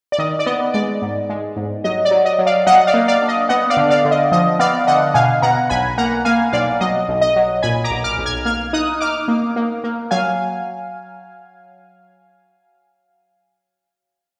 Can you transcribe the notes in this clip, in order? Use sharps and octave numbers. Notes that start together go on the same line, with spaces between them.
D5
D#3 D#5
D5
B3 D#5
G#3 D5
G#2
G#3
G#2
F#3 D#5
D5
F#3
D#5
F#3
D5 F5
F#3 D#5 F#5
D5 F5
A#3
D5 F5
D4
D#5
B3 D#5 F#5
D5 F5
D3
D5 F5
D3
D#5
F3 D#5
B3 D5 F5
D3 D#5 F#5
B2 F5 G#5
B2 F#5 A#5
B1 G#5 B5
A#3 F#5 A#5
A#3 F5 G#5
B1 D5 F5
F#3 D#5
B1
D#5
F#3
A#2 G#5 B5
A#5 D6
B1
D6 F6
B1
F6 G#6
A#3 F6 G#6
D#4 D#6 F#6
D#4 D6 F6
A#3
A#3
A#3
F#3 F5 G#5